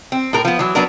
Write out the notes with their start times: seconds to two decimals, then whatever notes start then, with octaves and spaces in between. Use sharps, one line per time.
0.12 C4
0.33 A2 A#4
0.45 F3 B3
0.59 E3 F#3
0.75 F#3 B3 D4 A#4